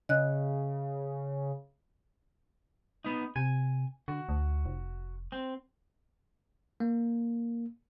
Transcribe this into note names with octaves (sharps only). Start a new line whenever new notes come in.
C#3 D#5 F#6
B3 D#4
C3 G#5
D3 F#4
D2
F1
C4
A#3